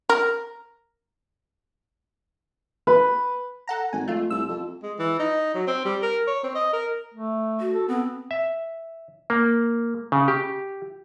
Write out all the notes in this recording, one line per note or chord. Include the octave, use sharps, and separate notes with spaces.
A#4
B4
A4 F#5 A#5
G#1 G#5
F2 A3 F4
C2 E6
F2
G#3
E3
D#4
F#3
C4
G3
A#4
C#5
C4
D#5
A#4
A3
F#4
A4
B3 C4
E5
A#3
C#3
G4